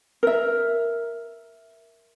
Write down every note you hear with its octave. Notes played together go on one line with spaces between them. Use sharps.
A#4 E5